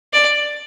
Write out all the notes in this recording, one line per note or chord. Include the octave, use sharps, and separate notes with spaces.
D5